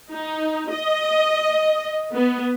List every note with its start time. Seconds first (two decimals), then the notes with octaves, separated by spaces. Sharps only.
0.13 D#4
0.72 D#5
2.13 B3